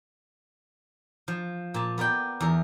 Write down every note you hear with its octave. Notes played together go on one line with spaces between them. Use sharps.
F3
A#2 A5
B3 A#4 D5 G5
E2 A#4